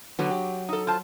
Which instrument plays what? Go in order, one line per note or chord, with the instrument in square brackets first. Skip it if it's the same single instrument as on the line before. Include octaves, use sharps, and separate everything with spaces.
[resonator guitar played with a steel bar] B2 D3 B3 [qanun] F#3
[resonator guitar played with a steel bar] G4
D#4 A4
F4 C5 A5